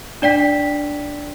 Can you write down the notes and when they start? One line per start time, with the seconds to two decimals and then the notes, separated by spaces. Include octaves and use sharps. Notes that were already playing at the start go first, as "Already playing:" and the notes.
0.22 D4 D5 G5 B6